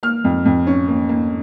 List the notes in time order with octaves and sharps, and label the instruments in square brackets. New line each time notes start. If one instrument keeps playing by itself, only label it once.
[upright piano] A#3 F6
F2
F2
C#4
A#3
A#3